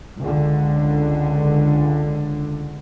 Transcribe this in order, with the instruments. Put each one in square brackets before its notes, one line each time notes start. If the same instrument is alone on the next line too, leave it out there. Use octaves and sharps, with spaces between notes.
[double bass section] C#2 D3